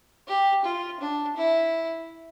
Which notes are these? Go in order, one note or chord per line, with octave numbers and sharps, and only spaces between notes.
G4
F4
D4
E4